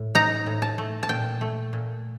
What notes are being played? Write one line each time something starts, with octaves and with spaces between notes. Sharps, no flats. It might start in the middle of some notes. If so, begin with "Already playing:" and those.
Already playing: A2
D#4 A#5
A2
A5
A3
A5
A#2 G5
A3
A#2